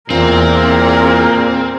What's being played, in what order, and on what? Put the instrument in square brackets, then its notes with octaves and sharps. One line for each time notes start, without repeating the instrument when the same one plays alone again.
[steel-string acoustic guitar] E2 F4 [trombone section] A#2 [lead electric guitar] C4 [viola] G#4 A#4